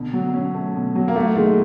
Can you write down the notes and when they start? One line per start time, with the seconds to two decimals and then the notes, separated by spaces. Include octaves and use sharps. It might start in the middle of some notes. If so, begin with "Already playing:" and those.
Already playing: B2 D3
0.13 F#3
0.34 C#4
0.54 A3
0.75 B2
0.95 F#3
1.08 A#3
1.16 D#2 A3
1.36 D#3 G#3